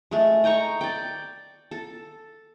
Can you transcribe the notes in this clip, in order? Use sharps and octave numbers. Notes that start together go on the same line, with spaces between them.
G#3 A3
D#5 G5 A#5 C#6
D5 G5
A4